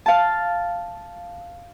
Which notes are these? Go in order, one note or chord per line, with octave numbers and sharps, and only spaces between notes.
F5 A5